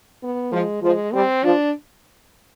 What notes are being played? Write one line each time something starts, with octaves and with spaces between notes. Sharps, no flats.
B3
F3 G#3
F3 G#3
G3 C4
F3 D4